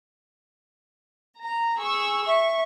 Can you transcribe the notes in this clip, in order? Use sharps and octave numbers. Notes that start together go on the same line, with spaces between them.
A#5
G#4 C#6 E6
E5 C#6